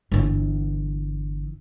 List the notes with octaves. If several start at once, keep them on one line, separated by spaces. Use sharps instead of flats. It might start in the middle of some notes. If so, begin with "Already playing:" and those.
G1 E3